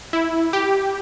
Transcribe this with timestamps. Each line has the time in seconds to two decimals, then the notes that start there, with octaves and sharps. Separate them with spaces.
0.13 E4
0.53 G4